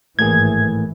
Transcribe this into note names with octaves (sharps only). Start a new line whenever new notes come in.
G#1 A2 E3 A#3 G#4 G#6